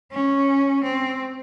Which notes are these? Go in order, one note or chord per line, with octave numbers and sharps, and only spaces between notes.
C#4
C4